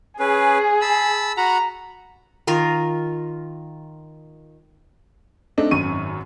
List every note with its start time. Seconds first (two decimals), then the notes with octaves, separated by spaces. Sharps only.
0.20 C#4 G#4 B4
0.81 A5 B5 E6
1.37 F#4 F#5 A#5 B5
2.47 D#3 F4 A#4
5.58 A3 C4 D4 D#4
5.71 G#1 F#2 C#6 D#7